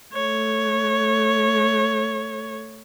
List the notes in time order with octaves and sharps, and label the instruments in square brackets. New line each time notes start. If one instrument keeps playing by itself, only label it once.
[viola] A3 C#5